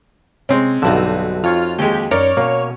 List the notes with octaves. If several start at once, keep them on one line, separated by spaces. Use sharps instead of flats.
C3 G#3 C4 C#4
B1 G2 D3 D#4 F#4 E5
F2 F4 C#5 F5
D#2 G#3 G4
F#2 D#4 A#4 C#5 D5
B2 A#3 C#4